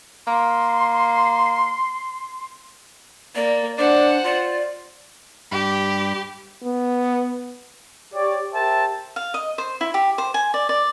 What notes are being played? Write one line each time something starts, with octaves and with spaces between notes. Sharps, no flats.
A#3 C6
A#3 D5
D4 C5 D5 F#5
F4 D5
G2 G4 B5
B3
G4 C#5 D5
G4 A#4 C5 E5 G5 A5
F5
D#5
C5
E4
G4
C5
G#5
D5
D5